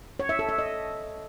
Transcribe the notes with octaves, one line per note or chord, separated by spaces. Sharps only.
C#5
E5
A4
E5
D#5